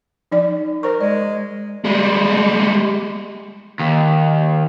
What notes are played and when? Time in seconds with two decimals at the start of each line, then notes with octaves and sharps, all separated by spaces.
0.32 F3 D#4 D5
0.83 A#4 C5 C#6
1.01 G#3 D5
1.84 G3 G#3
3.79 D#2